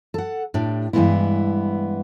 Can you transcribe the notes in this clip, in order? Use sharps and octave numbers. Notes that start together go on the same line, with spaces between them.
A4 F#5
A2 D4 G4
G2 E3 F3 G#3 B3 E4